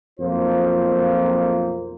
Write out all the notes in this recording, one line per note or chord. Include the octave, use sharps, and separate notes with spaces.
B1 F2 A#3 F4 C5